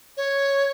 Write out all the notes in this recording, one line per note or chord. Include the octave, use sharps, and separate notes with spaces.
C#5